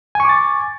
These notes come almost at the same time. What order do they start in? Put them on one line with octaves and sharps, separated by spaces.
G#5 C#6 D6 A6